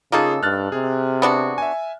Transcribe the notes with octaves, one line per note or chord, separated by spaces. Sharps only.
C#3 A#3 D#4 F4 G#4 A4
G2 F6 F#6 A6
C3 G#4
B3 D4 F#4
E5 G#5